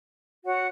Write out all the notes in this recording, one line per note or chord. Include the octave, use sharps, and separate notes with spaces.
F#4 C#5 F#5